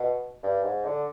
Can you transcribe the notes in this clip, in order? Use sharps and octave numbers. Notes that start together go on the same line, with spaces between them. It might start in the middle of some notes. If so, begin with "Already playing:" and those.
Already playing: B2
G2
G#2
D3